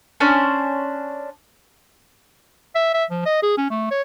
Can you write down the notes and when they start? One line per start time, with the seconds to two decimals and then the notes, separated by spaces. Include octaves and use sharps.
0.20 C#4 D4 C5
2.75 E5
2.94 E5
3.11 F3
3.26 D#5
3.42 G#4
3.57 C#4
3.70 A3
3.91 C#5